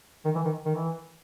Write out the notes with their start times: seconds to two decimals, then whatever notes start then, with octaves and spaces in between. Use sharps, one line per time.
0.25 D#3
0.35 E3
0.45 D#3
0.66 D#3
0.75 E3